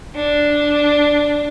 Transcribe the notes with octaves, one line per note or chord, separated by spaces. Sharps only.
D4